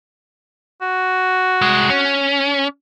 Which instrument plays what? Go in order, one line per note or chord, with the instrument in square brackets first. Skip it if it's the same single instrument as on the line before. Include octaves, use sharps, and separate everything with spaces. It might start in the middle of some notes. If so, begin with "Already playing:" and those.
[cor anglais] F#4
[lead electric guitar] C2 G#3
C#4